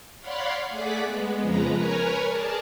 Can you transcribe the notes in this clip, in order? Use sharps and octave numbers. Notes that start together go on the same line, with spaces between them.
C#5 D5 F5 F#5 B5 C6
A3 G#4 D5 F#5 D6 B6
G#3 B3
F2 C#3 F3 G#3 B4 A#5
A#4 B4 C#5 G#5 A#5
G#4 A#4 D5 A5